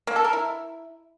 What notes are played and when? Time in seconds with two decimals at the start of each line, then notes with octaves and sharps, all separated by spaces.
0.07 A#3
0.16 A4
0.24 A#4
0.33 E4